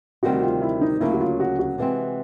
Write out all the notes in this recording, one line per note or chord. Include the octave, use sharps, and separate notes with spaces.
D2 C3 D#3 G3 C4 F#4
F4
E4
D#4
D2 C#3 F#3 A#3 C#4 E4
F#4
F4
F#4
F#4
C3 E3 G#3 C4